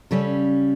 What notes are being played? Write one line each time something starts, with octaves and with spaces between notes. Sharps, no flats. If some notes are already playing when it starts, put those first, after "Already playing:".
C#3 G3 C#4 A4